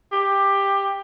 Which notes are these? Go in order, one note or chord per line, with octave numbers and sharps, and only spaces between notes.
G4